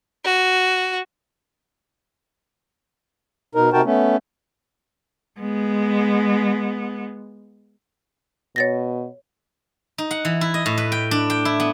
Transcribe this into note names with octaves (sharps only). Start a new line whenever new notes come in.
F#4
B2 D#4 A#4
C3 D#4 F#4 A#4 G5 A5
A3 B3 C#4
G#3 B3
B2 C#5 A6 A#6
D#4
F#5
E3
E4
D#5
A2
B4
G5
D4
G5
E4
B3